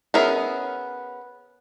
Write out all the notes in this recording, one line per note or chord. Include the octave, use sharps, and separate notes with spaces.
B3 C#4 G#4 A#4 E5